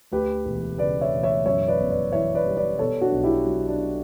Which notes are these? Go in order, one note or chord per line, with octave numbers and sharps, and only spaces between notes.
D2 G4 B4
E1
C#3 B4 D5
C#5 E5
E1
C#5 E5
F#2 C#5 E5
B4 D5
G1
B4 D5
E3 C#5 E5
B4 D5
G3
B4 D5
B2 A4 C#5
D4 F#4
B1
E4 G4
F#3
D4